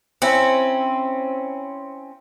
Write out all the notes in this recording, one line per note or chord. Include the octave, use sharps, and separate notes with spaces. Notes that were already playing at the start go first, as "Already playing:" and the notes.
C4 C#4 E4